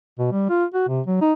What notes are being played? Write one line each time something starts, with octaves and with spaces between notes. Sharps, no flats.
B2
G3
F4
F#4
C3
F#3
D#4